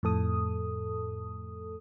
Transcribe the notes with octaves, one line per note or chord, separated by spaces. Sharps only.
F2 A2 A4 D#6